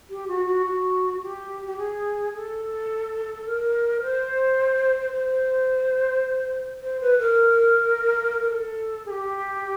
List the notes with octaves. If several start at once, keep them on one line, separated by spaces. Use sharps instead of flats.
G4
F#4
F#4
F#4
G4
G4
G#4
A4
A#4
C5
C5
C5
B4
A#4
A4
G#4
G4